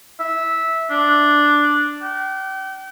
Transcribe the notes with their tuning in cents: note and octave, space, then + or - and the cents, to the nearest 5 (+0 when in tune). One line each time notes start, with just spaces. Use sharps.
E5 -10
D4 +0
G5 -40